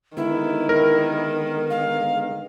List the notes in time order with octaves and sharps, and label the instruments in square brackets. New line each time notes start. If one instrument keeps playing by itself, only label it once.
[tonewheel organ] D3 G#3 B3 [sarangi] D#3 [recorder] E4
[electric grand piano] A#4
[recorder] F5